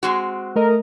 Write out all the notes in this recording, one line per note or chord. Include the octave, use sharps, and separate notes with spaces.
G#3 C4 F#4
A3 A#4 D#5